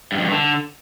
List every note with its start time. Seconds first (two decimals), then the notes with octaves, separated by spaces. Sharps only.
0.12 G2
0.18 F2
0.25 G2
0.32 D3